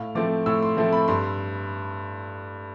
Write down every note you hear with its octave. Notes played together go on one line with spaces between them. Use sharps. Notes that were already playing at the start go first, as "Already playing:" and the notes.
Already playing: A2 F5
F3 A3 C4 D6
A2 E6
C6
F3 A3 C4
B5
G2 C6